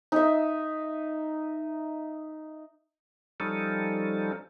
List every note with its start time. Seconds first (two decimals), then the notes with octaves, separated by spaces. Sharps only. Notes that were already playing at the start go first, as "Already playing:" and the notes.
0.12 D#4 E5
3.40 F3 G3 C#4 D#4 A4